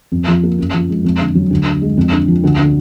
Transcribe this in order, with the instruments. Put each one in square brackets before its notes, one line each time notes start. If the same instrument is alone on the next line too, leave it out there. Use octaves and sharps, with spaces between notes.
[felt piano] F2
F3
A#3
F#2
F3
G#3
F2
D3
F#3
D2
D3
G#3
F2
D3
F3
D2
D3